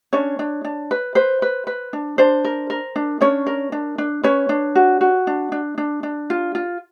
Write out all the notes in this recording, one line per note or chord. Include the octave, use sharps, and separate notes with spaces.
C#4 D4 C#5
D4
D4
B4
B4 C5
B4
B4
D4
D4 C5
A#4
A#4
D4
C#4 D4 C#5
A#4
D4
D4
C#4 B4 C#5
D4
F#4
F#4
D4
D4
D4
D4
F4
F4